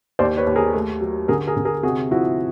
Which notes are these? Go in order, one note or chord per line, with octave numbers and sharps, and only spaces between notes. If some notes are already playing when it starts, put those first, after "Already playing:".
D#2 C5 D5
B4 C#5
D#2
G#4 A#4
A3
F#3
D3 G#4 A#4
G#4 A#4
D3
G#4 A#4
C3 F#4 G#4
F3 E4 F#4